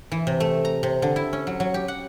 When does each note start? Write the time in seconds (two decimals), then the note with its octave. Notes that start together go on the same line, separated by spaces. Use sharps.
0.12 E3
0.27 C3
0.40 A3
0.65 A#5
0.83 C3
1.02 D3
1.16 E4
1.33 C#4
1.47 F#3
1.60 F#3
1.74 G4
1.88 F#5